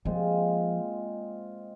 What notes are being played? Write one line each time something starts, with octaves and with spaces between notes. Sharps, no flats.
A#2 F3 G#3 C4 F4